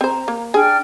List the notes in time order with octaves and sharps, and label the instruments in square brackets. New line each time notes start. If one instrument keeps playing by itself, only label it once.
[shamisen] C4 C5 [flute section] A#5
[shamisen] A#3
[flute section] D4 G5 F6 [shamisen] G#4